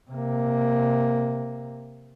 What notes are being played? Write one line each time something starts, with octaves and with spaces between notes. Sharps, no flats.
C3 A#3